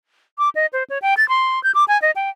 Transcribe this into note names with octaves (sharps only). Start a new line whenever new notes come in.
D6
D#5
C5
C#5
G5
A6
C6
G6
D6
G#5
D#5
G5